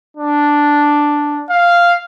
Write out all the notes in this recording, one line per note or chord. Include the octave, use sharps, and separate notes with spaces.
D4
F5